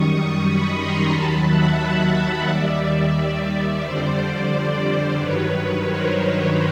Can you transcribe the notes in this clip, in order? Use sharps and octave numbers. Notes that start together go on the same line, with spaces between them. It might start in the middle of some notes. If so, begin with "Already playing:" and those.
Already playing: F#2 D#3 G3 C#6 D#6
C#6 D#6
B5 C#6
A#5 C6
D#2 D#3 F#3 A5 B5
E5 F#5
D#2 D#3 G3 D5 E5
D5 E5
F2 D3 G3 C5 D5
C5 D5
G2 D#3 F#3 B4 C#5
A#4 C5